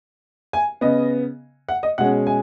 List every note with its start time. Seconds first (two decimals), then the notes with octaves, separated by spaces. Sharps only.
0.53 G#5
0.81 C#3 B3 D#5
1.69 F#5
1.83 D#5
1.98 B2 G#3 C#4 F#5
2.27 G#5